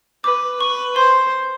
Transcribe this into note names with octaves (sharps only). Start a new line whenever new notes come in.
B4 D6
B4 C#6
C5 C6